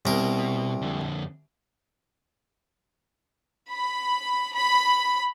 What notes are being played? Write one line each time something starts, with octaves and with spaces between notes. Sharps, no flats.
C2 B2 A#4
F2 D3
B5
B5